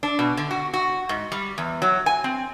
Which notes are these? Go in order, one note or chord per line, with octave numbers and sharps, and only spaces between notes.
D4
B2
D3
F#4
F#4
G#2
G3
E2
F#3
G#5
C4